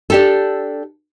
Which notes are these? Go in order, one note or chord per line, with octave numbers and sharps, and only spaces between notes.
D4 G4 A4